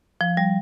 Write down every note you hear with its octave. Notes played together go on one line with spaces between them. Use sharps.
F3
G3